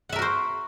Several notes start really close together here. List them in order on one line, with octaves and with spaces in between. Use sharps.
F#5 E5 A#4 F#4 C5